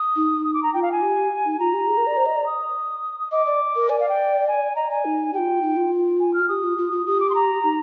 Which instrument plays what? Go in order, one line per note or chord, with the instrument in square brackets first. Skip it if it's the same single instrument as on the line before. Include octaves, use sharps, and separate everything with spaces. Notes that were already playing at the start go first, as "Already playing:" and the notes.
Already playing: [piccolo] D#6
[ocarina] D#4
[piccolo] D#6
D6
A#5
[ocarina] F4 [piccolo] G5
[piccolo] F5
G#5
[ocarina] G4
D#4
[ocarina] F4 [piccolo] A#5
[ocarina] G4
G#4
A#4
D5
C5
D#5
D5
[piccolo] D#6
[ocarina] D#5 [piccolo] D6
[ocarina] D5
A#4
[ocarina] D5 [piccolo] G#5
[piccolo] F5
G5
G#5
[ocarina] D#5 [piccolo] A#5
[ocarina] D5 [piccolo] G#5
[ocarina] D#4
[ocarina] F4 G4 [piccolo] G5
[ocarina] D#4
F4
[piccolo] G#5
F6
[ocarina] G4 [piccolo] D#6
[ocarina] F4
F4
F4
[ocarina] G4 [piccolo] D#6
[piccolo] D6
C6
A#5
[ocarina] D#4